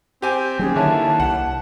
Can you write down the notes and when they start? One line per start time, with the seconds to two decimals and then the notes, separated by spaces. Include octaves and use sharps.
0.22 C4 G4 G#5
0.59 D#2 F#3 C#4 G#4
0.76 D3 D#3 E4 C#5 A5
1.20 C2 F#5